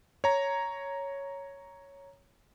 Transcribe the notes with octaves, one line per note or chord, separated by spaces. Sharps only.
C#5 A#5